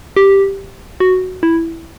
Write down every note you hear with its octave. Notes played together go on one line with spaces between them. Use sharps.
G4
F#4
E4